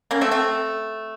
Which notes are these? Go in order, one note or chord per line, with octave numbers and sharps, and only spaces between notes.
A#3 C#4
A3 C4
A3 C4